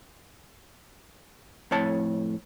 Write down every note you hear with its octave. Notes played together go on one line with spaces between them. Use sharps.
F2 A2 C#5 A5